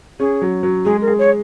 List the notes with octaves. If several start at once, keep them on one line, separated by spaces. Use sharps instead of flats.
C#4 G#4
F#3
F#3
G#3 G#4
A#4
G#4
C#5